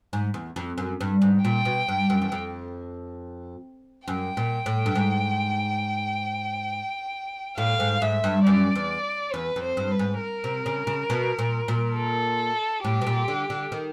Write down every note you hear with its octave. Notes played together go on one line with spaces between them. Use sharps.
G#2
E2
F2
F#2
G2
G#2
A#2 G5
B2
G2
F#2
E2
F2
F#2 G5
A#2
A2
G2
G#2
A2 F5
G#2
G#2 E5
G2
F#2 D5
E2
E2 B4
F2
C5
G2
B4
G#2
A#4
C3
C#3
C#3
B2
A#2
A#2
A4
A2 G4
B2
A#2
D3
D3
D#3